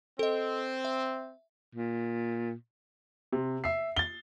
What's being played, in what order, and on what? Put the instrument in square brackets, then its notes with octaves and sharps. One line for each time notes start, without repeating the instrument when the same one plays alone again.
[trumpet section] C4 [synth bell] A4 D#5
[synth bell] E5
[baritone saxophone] A#2
[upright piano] C3
E5 C7
A6 G7